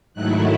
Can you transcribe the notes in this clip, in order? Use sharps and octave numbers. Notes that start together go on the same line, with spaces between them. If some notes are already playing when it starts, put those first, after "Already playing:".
G#2 D#3 F#3 A3 E4 F#6